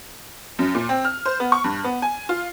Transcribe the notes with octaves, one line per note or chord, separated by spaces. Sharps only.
F#2
A#2
C4
F6
C5
B3
C#6
G2
B3
G#5
F4